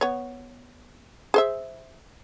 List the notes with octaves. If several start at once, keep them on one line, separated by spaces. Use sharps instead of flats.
B3 C#5
G#4 C5 E5